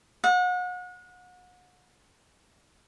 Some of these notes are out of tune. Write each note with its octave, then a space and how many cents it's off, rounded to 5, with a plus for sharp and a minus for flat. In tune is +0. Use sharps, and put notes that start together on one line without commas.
F#5 -35